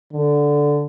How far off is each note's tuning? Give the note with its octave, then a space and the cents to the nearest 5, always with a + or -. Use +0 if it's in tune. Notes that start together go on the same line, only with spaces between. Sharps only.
D3 -5